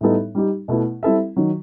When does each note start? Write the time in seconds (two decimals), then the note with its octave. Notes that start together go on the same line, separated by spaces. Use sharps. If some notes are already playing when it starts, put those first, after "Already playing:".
0.01 A2 G3 B3 D#4 A4
0.35 G3 D#4 G4
0.68 B2 A3 E4 B4
1.03 G3 C4 E4 A4 E5
1.36 D#3 F#3